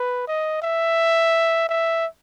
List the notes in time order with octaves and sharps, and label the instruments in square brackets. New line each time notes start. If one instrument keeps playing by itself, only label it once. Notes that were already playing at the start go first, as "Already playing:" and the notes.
Already playing: [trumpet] B4
D#5
E5
E5